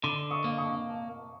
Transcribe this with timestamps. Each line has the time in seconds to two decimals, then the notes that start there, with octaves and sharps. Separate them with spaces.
0.03 D3 C6 D6
0.31 C#6 D#6
0.44 A#3
0.58 C#6 D#6